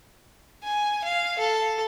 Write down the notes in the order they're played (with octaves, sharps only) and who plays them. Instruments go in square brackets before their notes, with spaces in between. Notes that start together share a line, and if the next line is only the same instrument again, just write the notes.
[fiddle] G#5
F5
A4